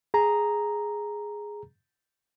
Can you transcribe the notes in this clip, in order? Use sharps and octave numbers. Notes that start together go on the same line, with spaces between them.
G#4 A#5